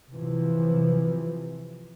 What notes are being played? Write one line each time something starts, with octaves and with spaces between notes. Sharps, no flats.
C3 E3 F3